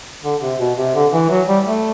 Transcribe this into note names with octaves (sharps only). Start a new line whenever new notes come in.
D3
C3
B2
C3
D3
E3
F#3
G3
A3